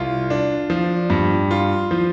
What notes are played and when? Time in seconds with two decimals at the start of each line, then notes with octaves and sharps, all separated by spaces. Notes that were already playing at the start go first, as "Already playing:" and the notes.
Already playing: C2 F4
0.30 D4
0.70 F3
1.10 G2
1.51 F4
1.91 F3